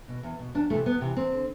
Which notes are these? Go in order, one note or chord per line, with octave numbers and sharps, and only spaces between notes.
B2
E2
B2
E2 D4
C3 E3 A3
E2 B3
C3 E3
E2 C4
D3